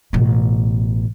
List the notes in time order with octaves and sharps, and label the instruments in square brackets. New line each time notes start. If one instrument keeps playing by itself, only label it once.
[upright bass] A1 B2